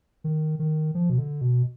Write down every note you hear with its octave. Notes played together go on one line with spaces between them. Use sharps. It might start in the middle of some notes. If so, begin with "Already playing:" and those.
D#3
D#3
F3
B2
D3
B2